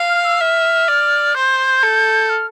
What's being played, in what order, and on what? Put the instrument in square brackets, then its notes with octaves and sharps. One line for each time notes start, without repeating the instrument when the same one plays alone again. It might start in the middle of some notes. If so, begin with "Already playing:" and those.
Already playing: [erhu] F5
[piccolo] F6
E6
[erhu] E5 [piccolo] F6
[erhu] D5
[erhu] C5 [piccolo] G6
[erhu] A4
[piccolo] F6